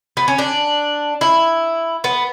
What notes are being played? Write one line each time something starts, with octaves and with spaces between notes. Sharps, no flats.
B3
C#4
D4
E4
B3